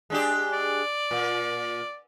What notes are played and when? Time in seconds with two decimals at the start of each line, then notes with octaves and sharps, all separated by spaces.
0.10 G#3 D4 G4
0.53 D5
1.11 A#2